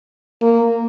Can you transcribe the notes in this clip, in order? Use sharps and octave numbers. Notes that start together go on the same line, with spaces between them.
A#3